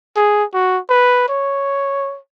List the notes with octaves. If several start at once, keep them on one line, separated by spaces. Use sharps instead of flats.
G#4
F#4
B4
C#5